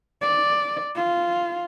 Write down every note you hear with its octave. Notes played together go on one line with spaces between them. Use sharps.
D5
F4